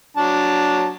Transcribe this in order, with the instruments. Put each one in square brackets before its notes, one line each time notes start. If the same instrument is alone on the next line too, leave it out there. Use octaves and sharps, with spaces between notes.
[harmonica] F#3 D4 A5